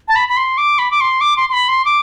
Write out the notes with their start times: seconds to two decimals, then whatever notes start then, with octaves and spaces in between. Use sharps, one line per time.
0.08 A5
0.16 B5
0.29 B5
0.37 C6
0.58 D6
0.79 B5
0.91 D6
1.01 C6
1.21 D6
1.37 C6
1.50 C6
1.53 B5
1.68 C6
1.85 D6